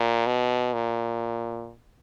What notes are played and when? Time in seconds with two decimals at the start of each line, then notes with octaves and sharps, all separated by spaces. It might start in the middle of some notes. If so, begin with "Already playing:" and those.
Already playing: A#2
0.27 B2
0.73 A#2